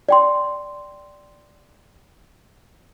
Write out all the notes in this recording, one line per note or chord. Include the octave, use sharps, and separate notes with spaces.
D5 G5 C6